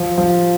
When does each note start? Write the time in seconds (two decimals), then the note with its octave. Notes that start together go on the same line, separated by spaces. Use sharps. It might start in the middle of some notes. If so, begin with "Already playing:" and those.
Already playing: F3
0.18 F3